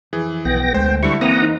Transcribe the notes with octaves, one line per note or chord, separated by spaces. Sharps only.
F2 E3 G#4
B1 B3 G5 A#6
D2 G#3 A3 C5 G5
D3 G3 E4 C#6
E3 A#3 C4 F#5 A#5 D#6
E2 D#4 C5